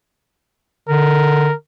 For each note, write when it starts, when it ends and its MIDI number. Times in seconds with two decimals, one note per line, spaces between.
0.89 1.50 50
0.89 1.54 70